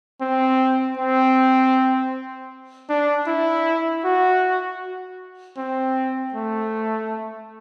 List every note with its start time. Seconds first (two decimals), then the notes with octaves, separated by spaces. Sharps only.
0.21 C4
0.97 C4
2.89 D4
3.27 E4
4.04 F#4
5.57 C4
6.34 A3